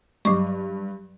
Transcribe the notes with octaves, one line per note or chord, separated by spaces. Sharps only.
G2 F#3 C#6